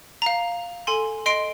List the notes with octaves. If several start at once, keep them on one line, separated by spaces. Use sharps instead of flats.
F5 A#5
A4 G#5 C6
D#5 C6 C7 D7